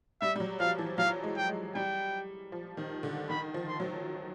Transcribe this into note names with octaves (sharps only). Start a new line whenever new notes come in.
G3 E5
G3
F#3
F3 F5
E3
F#3 F5
G#3
G5
G#3
G3 G5
F3
D#3
D3
D#3 B5
F3
C6
F#3